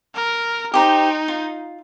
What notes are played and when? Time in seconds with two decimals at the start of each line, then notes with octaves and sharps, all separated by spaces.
0.15 A#4
0.74 D#4 G4 C5 A#5
1.28 F4